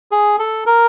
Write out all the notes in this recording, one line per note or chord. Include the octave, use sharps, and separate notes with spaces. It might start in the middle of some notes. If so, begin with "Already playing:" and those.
G#4
A4
A#4